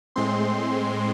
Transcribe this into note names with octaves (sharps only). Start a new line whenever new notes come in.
A2 G#3 C4 C6